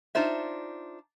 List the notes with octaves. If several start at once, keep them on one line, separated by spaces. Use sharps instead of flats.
D4 D#4 F4 C5 E5